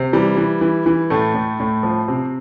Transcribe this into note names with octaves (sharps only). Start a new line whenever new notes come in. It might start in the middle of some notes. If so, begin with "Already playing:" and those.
Already playing: C3
E3 G3
E3
E3
E3
A2 A3
A2
A2
F3
C3 C4